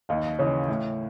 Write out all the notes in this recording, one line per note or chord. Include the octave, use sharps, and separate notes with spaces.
D#2 D#5 F5
C#3 E3 C#5 D#5
A2